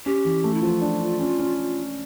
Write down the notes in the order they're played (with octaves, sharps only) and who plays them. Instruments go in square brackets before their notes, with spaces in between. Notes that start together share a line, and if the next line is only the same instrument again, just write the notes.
[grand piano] C#4 [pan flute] G4
[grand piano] E3
A3
[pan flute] E4
[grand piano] F3 [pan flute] F4
[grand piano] D4
D4
C#4
C#4